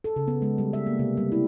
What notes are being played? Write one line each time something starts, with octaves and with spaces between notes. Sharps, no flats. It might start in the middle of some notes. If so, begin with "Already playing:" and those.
A4
C#3
B3
G#3
G3
E5
A#3
C3
G3
E4